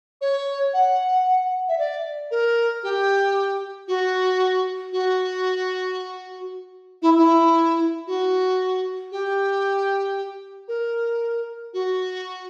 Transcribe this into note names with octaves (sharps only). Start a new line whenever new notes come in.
C#5
F#5
E5
D5
A#4
G4
F#4
F#4
E4
E4
F#4
G4
A#4
F#4